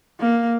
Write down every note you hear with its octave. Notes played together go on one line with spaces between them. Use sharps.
A#3